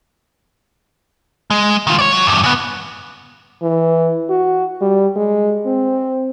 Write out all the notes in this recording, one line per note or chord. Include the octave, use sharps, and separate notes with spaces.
G#3
D#3 F4
C#5 D5
F#3
E2 G2
C#3 B3
E3
F#4
G3
G#3
C4